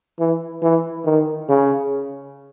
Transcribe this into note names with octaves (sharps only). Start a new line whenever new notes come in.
E3
E3
D#3
C#3